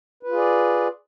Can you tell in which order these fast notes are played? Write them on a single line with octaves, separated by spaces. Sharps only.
B4 F4 G#4 D5